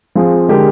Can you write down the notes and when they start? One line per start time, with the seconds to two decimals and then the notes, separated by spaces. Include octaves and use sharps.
0.15 F3 C4 F4 G#4
0.48 D3 G#3 D4 G4 A#4